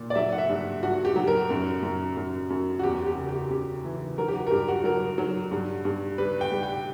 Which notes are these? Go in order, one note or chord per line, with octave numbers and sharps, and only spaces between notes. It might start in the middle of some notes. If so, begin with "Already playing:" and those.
Already playing: A#2
D5
F#3 E5
F#5
E5
G2
G2 F#4
G4
F#3
A#4
F#2
F#2
F#2
F#2
F#4
E2 G4
G4
C#3
G4
C#3 G4
E3
F#3 A#4
G4
F#4
A#4
G2 G4
F#4
F#3 A#4
F#3
G2
G2
G3 B4
G5
G3
G5